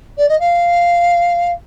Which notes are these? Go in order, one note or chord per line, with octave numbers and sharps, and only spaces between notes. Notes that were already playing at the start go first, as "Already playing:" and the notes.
D5
D#5
F5